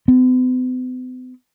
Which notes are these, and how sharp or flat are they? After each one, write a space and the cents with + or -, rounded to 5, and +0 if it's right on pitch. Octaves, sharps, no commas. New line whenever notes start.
B3 +45